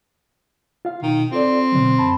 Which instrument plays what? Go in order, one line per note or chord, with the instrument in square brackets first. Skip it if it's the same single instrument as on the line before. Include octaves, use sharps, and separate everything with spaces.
[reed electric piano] F4 F5
[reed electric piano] B2 [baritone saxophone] D#3
[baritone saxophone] C4 [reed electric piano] F4 A4 D5
[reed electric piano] B2 D3 F#3
F#2 A5 B5